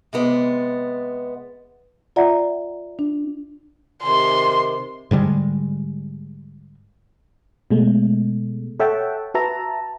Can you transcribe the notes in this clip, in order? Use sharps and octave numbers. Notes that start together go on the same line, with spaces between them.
C3 G#3 B3 D5
F4 D5 E5 F#5 A#5
D4
C3 D#3 C6
G#2 D3 G3 G#3
B2 G#3 A3
A4 C#5 E5 F#5 G5 A5
F#4 B4 E5 A5 A#5